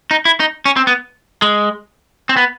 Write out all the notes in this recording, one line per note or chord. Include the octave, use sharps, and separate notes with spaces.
D#4
E4
D#4
C#4
C4
B3
G#3
C4
B3